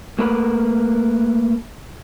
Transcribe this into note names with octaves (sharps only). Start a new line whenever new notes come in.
A3 A#3 A#4 B4